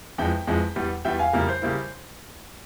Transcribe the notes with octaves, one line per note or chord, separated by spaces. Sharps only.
F2 E3 G#3 E5 G5
F2 E3 G#3
E2 E3 G3
E2 E3 G3 E5 G5
F5 G#5
F2 C#3 G3 A#3 E4 A#4
C5
C#3 G3 A#3 E4